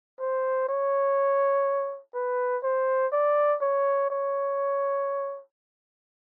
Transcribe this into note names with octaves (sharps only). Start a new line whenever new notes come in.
C5
C#5
B4
C5
D5
C#5
C#5